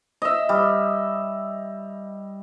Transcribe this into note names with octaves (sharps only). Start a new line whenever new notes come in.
D#5 E5
G3